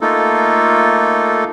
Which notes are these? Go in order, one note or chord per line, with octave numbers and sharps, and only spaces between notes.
A3 A#3 D#4 F4 A4